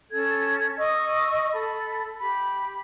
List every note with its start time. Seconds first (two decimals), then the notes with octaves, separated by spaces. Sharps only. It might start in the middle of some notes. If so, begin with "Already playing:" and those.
0.10 C#4 A4 G#6
0.78 D#5 C#6 E6
1.52 A4 B5
2.19 G4 B5